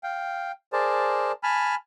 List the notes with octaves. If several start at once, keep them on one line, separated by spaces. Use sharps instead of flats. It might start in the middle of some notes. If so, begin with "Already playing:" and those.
F5 G5
G#4 A#4 C5 D5 A5
G#5 A5 B5 F6